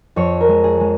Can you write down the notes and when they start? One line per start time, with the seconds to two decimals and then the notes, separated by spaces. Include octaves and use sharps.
0.16 F2 C#5
0.41 A#4
0.48 G#3
0.64 G#4
0.81 G#3